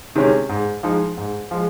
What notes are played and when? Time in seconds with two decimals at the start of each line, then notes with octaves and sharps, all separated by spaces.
0.15 C3 D#3 G#3 C#4
0.49 G#2
0.83 F3 G#3 D#4
1.17 G#2
1.51 F3 G#3